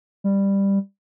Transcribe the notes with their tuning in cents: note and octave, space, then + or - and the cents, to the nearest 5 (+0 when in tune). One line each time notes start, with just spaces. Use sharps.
G3 +10